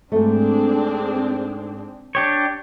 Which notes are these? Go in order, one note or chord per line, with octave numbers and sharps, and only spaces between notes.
G#2 A3 C4 D4 G#4
D4 G4 C#5